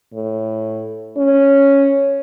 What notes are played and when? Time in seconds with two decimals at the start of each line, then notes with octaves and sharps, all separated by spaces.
0.14 A2
1.17 C#4